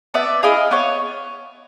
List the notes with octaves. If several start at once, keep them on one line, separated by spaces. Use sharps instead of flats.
B3 D5 E5
E4 G#4 D#5 F5
B3 C#5 D#5